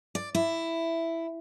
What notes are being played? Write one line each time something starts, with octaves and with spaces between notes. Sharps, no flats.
D5
E4